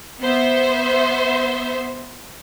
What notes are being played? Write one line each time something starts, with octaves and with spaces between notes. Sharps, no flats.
B3 C5 E5